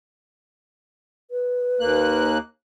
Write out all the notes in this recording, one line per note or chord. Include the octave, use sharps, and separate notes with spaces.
B4
D#2 A#3 F#6